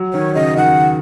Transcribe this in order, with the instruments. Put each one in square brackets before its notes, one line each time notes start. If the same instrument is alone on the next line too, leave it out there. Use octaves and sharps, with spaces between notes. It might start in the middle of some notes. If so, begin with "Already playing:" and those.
Already playing: [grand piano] F#3
[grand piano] D#3 [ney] C#5
[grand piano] C#3 [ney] D#5
[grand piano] D#3 [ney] F#5